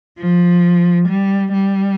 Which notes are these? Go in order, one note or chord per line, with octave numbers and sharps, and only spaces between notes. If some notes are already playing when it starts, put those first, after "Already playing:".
F3
G3
G3